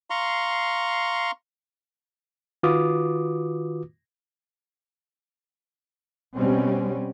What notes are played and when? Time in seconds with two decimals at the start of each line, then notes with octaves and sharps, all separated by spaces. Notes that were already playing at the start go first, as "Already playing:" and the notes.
0.10 F5 A#5 C6 C#6
2.63 D#3 F4 F#4 B4 D6 D#6
6.37 B2 G3 C4 C#4